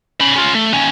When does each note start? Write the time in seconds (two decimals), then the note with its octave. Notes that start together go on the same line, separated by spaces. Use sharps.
0.21 C#4 B5
0.36 C#4 F4
0.55 A3
0.73 D#2 C#4